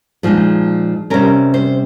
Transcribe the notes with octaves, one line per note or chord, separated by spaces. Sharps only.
A#2 F3 G#3 D#4 G#4
C3 G3 C#4 A#4
C5